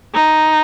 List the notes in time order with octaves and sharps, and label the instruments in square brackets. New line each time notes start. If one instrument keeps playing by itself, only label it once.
[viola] D#4